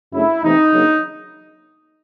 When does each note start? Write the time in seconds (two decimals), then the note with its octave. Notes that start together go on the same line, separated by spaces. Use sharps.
0.12 F#2 C#3 F#3 A3 D4 E4
0.42 E2 C3 E3 A3 C4 D#4
0.72 C#3 F#3 A#3 D4